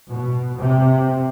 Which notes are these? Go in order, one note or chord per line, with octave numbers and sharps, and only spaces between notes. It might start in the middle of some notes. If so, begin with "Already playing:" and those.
B2
C3